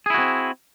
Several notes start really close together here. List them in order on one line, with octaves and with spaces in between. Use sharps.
G#4 E4 F#4 C4